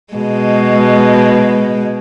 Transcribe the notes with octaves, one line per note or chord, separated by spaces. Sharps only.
B2 G#3